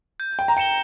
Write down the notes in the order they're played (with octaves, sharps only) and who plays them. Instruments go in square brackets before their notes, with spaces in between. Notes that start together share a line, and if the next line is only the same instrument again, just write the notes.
[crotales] G6
[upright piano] G5
A#5
[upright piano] G5 [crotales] C#7 E7 G7